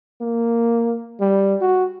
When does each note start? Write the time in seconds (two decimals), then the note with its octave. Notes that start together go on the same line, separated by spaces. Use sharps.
0.21 A#3
1.21 G3
1.62 F#4